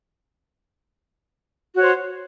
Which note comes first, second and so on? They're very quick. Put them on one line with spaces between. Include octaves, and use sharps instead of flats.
F#4 C#5 C5